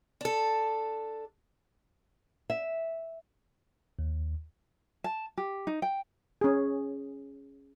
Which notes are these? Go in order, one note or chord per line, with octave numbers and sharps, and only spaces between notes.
D4 A4
E5
D#2
A5
G4
D#4
G5
C#4 G#4